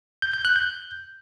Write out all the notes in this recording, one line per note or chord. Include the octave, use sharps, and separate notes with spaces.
G6
G6
F#6
G6